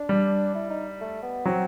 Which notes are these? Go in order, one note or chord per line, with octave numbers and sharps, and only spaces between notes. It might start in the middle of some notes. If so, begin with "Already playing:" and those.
Already playing: D4
G3
E4
D#4
A3
B3
F#3 C4